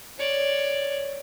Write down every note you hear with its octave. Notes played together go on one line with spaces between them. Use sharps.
C#5 D5